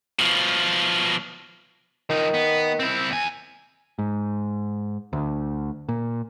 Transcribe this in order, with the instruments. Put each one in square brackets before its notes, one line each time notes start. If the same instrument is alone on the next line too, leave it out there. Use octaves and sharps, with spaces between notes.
[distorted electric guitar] B2 F3
[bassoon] D#3 [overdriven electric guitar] F3 D#4
[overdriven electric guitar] B3
C4 E4
E2 G#5
[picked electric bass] G#2
D2
A#2